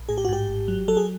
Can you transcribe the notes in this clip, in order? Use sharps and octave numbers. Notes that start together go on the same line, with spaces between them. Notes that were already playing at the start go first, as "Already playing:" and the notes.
Already playing: A#1
A2 G#4
G4
F#4
G#2 G4
G#1
F#3
F#3 A4
G#4